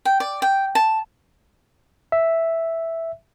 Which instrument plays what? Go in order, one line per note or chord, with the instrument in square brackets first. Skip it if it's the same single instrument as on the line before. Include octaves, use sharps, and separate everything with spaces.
[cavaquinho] G5
D5
G5
A5
[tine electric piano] E5